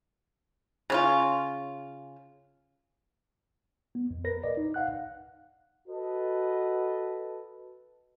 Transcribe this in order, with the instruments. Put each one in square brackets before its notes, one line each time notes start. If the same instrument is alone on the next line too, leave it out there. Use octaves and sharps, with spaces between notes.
[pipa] C#3 C#4 F4
[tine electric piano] B3
F2
A#4 B4 A#6
D5 D#5
D#4
F5 F#5 F#6
[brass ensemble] F#4 A4 B4 D#5